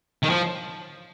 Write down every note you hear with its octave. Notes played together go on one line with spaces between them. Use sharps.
D#3
F3